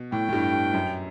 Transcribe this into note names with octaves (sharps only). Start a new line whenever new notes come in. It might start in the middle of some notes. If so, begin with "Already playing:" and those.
Already playing: B2
A2 G5
A2
G2
G2
F#2